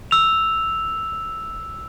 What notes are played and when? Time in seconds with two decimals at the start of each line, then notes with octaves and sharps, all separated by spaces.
0.11 E6 F7